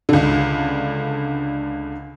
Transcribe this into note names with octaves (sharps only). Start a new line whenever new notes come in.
C#2 D3